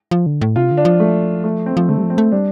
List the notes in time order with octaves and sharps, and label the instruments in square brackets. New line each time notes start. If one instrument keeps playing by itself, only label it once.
[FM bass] F3
D3
A2
[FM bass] C3 [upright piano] F4
[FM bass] D3
[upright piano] D4
[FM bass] F3
[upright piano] A3
A3
C4
[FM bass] F3
[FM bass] D3 [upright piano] A3
[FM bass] G3
F3
[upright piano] C4
[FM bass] A3
[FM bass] G3 [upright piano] D4